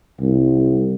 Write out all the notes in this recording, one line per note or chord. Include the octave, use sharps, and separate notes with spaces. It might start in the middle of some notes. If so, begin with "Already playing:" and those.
C2